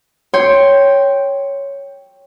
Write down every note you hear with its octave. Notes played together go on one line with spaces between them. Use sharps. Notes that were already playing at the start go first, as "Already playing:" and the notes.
C#5 G5 C6